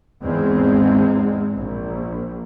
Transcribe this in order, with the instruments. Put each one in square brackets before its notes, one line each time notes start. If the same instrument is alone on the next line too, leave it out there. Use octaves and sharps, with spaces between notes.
[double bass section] E2 G#2 G#3 C4
A#1